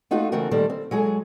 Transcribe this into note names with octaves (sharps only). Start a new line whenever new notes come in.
A3 D#4 F4 F#4 A4
C#3 E3 A3 C4 F#4 A#4
A#2 D#3 G3 A4 C5
C4
F#3 G#3 G#4 A4